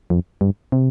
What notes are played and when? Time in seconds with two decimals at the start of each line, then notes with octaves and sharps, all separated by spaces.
0.10 F2
0.41 G2
0.72 C3